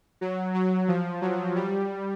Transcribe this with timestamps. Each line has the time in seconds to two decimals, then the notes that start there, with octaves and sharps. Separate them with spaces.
0.21 F#3
0.54 F#3
0.88 F3
1.22 F#3
1.56 G3